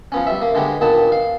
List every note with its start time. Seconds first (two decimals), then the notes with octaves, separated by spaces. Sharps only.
0.12 F3 B3 C#4
0.27 G3 E5
0.42 A#3
0.55 D3 G#3 B3 G4
0.81 A#2 D#3 B3 A5
1.12 F5